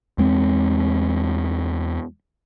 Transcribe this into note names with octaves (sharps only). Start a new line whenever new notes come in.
E2 G#3 C4